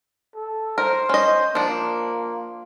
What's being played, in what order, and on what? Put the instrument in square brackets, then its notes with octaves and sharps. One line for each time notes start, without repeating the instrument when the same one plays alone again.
[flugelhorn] A4
[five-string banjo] A#4 [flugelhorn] C5
[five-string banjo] C#4 D#5
[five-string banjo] F3 D4 [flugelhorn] A#3